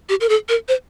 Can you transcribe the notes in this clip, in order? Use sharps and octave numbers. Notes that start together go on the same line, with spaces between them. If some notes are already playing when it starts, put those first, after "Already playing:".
G4
A#4
A4
A#4
C5